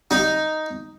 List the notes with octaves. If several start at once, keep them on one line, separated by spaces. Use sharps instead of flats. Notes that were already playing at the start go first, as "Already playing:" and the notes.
D#4